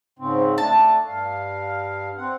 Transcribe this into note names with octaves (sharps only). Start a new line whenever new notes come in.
G#2 C#3 C4
A3 D4 A5
G2 F5
C4 F#5